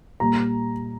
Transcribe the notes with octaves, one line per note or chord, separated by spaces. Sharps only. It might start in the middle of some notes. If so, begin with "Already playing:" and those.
A#2 G3 A#5